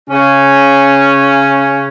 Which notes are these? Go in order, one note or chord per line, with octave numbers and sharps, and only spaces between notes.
C#3 C#4